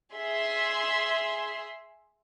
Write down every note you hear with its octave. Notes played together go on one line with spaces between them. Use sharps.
G#4 E5 C6